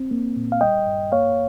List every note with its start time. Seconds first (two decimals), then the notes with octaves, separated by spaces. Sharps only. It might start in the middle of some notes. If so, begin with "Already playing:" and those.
Already playing: C4
0.11 A#3
0.36 A#2
0.52 F5
0.61 G3 D#5 G5
0.87 G2
1.12 A#3 C#5 F5